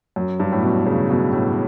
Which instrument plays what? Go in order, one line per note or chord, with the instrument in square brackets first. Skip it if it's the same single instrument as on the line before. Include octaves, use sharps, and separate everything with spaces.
[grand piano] F#2
G2
A2
B2
C#3
B2
A2